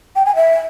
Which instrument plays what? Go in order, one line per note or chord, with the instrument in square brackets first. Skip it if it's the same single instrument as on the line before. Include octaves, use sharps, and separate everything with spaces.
[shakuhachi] G5
G#5
E5